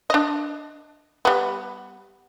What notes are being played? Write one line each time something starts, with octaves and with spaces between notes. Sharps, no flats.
D4 D#5
G3 B3